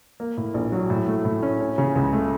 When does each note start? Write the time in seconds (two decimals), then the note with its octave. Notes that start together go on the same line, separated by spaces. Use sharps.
0.20 A#3
0.37 A2
0.54 A#1
0.72 F#3
0.90 A2
1.08 A3
1.25 A2
1.43 C#4
1.60 C#4
1.78 C#3
1.95 C#2
2.13 A3